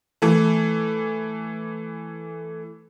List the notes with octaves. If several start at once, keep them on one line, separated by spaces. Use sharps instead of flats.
E3 A3